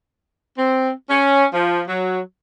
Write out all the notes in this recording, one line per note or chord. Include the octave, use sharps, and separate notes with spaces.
C4
C#4
F3
F#3